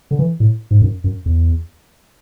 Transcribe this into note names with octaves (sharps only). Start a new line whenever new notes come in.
D3
E3
A2
G#2
F#2
F#2
E2